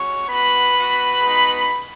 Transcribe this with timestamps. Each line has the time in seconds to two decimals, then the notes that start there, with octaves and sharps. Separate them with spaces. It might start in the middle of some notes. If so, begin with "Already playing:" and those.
Already playing: G#3 C#4 F#4 C#5 C#6
0.28 B3 F#4 B4 B5
0.74 B3 F#4
1.21 G#3 B3 D#4 F#4